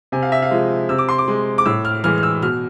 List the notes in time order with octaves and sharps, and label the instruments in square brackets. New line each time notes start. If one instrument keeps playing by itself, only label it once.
[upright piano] C3 G#5
F5
E5
F5
F3 G#3
C3 E6
D6
C6
D6
G#3
D6
A2 E6
F6
E3 G#3 F6
F6
E6
B2 F6